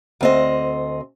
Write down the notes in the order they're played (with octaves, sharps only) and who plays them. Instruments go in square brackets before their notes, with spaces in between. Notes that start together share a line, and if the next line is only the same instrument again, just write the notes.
[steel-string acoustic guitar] D2 C4 D#5